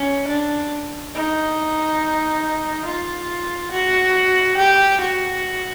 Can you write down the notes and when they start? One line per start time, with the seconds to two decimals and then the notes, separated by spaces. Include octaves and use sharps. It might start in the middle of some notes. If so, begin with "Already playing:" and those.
Already playing: C#4
0.28 D4
1.15 D#4
2.85 F4
3.71 F#4
4.57 G4
5.00 F#4